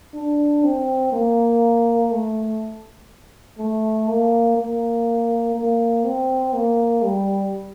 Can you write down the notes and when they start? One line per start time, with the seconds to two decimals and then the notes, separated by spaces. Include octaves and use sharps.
0.14 D4
0.64 C4
1.12 A#3
2.11 A3
3.58 A3
4.08 A#3
4.57 A#3
5.55 A#3
6.04 C4
6.53 A#3
7.03 G3